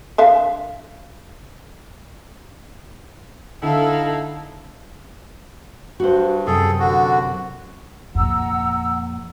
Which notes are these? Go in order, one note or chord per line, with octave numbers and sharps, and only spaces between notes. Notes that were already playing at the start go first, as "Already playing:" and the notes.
D3 E5 F5
D3 D#4 E4 A4 F5
G2 F#4 C5
F#2 C3 G#4 A4
D3 F#4
F2 A#2 F#5 A#5 E6